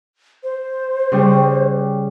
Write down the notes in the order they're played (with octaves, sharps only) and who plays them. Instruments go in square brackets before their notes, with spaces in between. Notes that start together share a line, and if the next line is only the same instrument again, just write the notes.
[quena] C5
[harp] C#3 G3